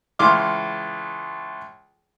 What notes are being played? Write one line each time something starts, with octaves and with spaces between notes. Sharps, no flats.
C#2 E3 C6 D6 F6